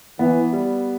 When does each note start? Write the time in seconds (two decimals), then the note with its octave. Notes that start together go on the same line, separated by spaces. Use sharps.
0.19 E3 B3
0.53 G3